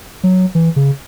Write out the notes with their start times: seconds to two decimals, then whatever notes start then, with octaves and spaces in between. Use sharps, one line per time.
0.24 F#3
0.55 E3
0.76 C#3